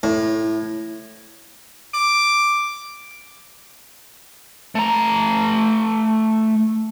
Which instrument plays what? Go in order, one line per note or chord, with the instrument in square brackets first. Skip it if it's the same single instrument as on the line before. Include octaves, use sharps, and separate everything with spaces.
[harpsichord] A2
[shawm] D6
[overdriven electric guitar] A3 A#5